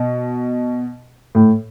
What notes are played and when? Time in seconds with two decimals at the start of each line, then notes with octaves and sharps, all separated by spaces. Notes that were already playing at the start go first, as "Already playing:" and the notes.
Already playing: B2
1.35 A2